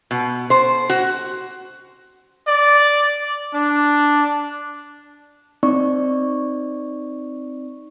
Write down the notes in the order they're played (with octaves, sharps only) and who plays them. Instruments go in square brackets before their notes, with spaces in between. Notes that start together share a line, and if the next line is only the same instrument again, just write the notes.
[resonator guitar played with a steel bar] B2
C5
F#4
[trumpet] D5
D4
[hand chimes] C4 D#4 D5 C#6